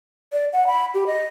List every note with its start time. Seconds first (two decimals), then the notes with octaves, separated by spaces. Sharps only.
0.33 D5
0.53 F#5
0.67 B5
0.94 G4
1.07 D#5